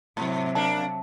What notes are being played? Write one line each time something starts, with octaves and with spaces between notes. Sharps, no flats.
G#2 C3 F#3
A#3 D4 A5